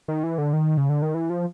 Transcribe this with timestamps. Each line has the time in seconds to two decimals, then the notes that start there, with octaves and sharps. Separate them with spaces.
0.08 D#3
0.23 E3
0.38 D3
0.53 D#3
0.77 C#3
0.89 D3
1.02 D#3
1.14 E3
1.30 F3